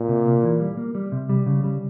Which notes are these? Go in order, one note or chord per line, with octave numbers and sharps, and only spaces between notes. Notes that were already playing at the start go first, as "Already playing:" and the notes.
Already playing: A#2
C3
A#3
E3
G3
A#3
G3
C3
G3
C#3
G3